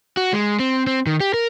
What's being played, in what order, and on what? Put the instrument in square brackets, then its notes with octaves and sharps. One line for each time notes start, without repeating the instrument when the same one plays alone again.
[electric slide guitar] F#4
G#3
C4
C4
D#3
G4
A#4